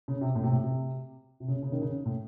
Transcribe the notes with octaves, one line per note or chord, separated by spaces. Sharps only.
C#3
C3
A2
C3
A2
C3
C3
C#3
C#3
D#3
C#3
A2